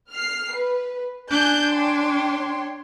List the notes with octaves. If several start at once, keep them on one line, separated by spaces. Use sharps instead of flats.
F6 C7
B4
D4 G#5 F#6 G6
C#5 G5 C6